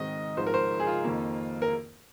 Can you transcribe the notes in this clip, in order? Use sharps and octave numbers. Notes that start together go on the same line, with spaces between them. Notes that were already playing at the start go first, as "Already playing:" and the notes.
Already playing: G#2 D#3 C4 D#5
G#1 G#2 F3 C5
A#4
C5
G#4
F4
F2 D#3 A#3
A#4